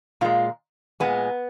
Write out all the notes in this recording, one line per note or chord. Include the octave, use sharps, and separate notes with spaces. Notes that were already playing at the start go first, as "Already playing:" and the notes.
A#2 G#3 F4
A#2 G#3 B3